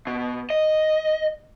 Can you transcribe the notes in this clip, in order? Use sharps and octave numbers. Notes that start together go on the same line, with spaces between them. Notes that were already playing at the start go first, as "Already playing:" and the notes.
B2
D#5